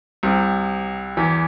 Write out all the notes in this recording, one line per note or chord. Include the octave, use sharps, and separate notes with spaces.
C2 C3
E2 E3